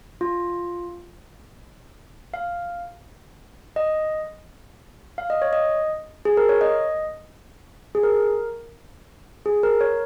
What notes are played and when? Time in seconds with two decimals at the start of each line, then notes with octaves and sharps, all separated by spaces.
0.21 F4
2.34 F5
3.76 D#5
5.18 F5
5.30 D#5
5.42 C#5
5.53 D#5
6.25 G#4
6.37 A#4
6.49 C#5
6.61 D#5
7.95 G#4
8.03 A#4
9.46 G#4
9.63 A#4
9.81 C#5